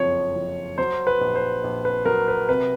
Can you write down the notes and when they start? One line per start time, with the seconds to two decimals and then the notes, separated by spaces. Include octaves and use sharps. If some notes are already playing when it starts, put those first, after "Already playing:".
Already playing: F#1 F2 F3 C#5
0.36 F3
0.78 F#3 C5
1.07 B4
1.21 A#1
1.35 C5
1.64 A#1
1.85 B4
2.05 F#3 A#4
2.28 B4
2.49 C3 B4